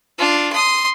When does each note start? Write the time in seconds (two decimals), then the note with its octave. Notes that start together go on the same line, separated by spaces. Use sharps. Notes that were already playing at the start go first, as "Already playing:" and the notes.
0.18 D4 F4
0.52 C6 D#6